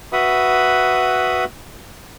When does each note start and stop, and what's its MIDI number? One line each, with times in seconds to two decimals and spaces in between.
0.13 1.45 66
0.13 1.45 71
0.13 1.45 76
0.13 1.45 78
0.13 1.45 83
0.13 1.45 87